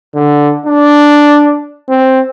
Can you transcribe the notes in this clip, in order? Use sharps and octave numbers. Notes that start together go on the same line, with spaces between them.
D3
D4
C4